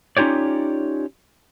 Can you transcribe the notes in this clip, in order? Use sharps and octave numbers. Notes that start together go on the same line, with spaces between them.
C#4 D#4 F4 G4 C#5 D5